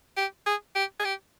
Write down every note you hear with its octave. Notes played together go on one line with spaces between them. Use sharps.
G4
G#4
G4
G#4
G4